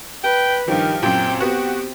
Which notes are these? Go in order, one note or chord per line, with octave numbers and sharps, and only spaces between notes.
B4 G5
G2 D#3 F3 G4
F#2 A#2 C4 G5
B3 F#4 G4